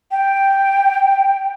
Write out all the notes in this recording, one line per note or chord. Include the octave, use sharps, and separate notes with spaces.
G5